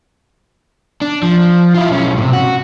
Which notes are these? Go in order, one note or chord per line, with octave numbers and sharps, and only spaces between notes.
D4
F3
E4 F4
B1 C#4
A2 C3
F#4